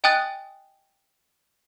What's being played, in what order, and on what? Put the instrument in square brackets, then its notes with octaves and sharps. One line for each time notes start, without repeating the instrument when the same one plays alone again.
[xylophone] D#5 G5 G#5 D#6 F#6 A6